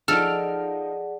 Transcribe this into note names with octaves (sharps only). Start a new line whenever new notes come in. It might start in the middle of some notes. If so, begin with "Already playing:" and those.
F3 D#4 G#4 A4 D5 F#5 F6 D7